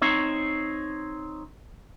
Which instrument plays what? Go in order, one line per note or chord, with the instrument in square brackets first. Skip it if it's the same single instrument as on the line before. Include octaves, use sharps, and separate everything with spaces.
[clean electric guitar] C4 D#4 C#5